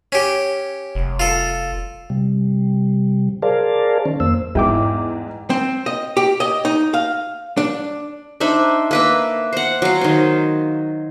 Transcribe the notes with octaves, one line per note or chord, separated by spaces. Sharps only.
C#4 G4
F1
F4 A4
C3 G3
G#4 A#4 C5 D5 F5 A5
D#3 C#4
F2 A#3 C5 E6
E2 G#2 G#3 E4 G5 D6
C4
D#5
G4
D#5
D#4
F5
D4
D4 D#4 C5 E5
A#3 B4 E5
C5 F#5
F#3 F5
D#3 C5